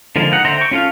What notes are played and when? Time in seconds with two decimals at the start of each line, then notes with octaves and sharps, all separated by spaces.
0.16 D3 F3 G#3 A#3
0.32 D#4 F#5
0.45 D3 C5 E5 A#5
0.57 G5 C#6
0.71 C#4 F4 A4 F5